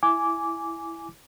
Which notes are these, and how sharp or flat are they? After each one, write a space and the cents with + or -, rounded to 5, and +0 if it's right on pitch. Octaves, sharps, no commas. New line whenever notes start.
E4 +10 G#5 +0 D6 -10